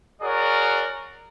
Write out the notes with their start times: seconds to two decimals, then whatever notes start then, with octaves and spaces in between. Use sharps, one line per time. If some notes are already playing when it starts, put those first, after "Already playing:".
0.22 F#4 G#4 A#4 C#5 D5